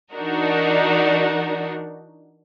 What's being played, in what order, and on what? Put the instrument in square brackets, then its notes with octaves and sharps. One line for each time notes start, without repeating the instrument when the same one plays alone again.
[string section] E3 D4 D#4 F#4 A#4